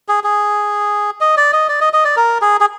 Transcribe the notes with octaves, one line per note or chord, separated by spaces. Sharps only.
G#4
G#4
D#5
D5
D#5
D5
D#5
D#5
D5
A#4
G#4
G#4